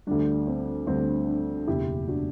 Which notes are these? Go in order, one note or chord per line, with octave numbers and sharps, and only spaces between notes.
D2 D3 G3 D4
C4
D2 D3 G3 C4
D4
F#1 E2 B2 E4 G4
D4 F#4